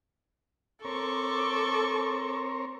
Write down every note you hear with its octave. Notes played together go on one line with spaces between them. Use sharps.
C4 A4 A#4 C#5 C#6 D6